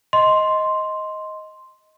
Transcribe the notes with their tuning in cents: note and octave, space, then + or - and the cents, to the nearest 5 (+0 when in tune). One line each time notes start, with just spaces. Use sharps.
D#5 +10 C6 +0